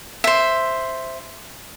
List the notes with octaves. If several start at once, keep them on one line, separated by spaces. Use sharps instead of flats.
C5 E5